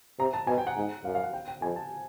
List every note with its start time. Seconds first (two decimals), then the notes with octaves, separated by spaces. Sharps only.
0.19 C3 A#5
0.33 A5
0.47 B2 G#5
0.58 G5
0.67 F#5
0.77 G#2
1.04 F#2 F5
1.15 F5
1.24 F#5
1.33 G5
1.48 G5
1.62 F2 G#5
1.76 A5